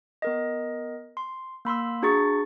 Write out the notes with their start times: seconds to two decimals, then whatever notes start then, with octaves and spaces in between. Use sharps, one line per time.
0.22 B3 A#4 D#5
1.17 C6
1.65 A#3 B5 C6 E6
2.02 D4 F#4 G#4 A#5 C#6 A6